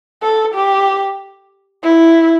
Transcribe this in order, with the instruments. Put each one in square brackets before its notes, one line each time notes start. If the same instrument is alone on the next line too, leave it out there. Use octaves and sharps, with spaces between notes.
[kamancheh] A4
G4
E4